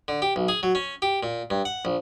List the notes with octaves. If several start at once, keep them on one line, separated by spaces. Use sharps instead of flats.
D3
G4
B1
G#4
F#3
C#4
G4
A#2
G2
F#5
A#1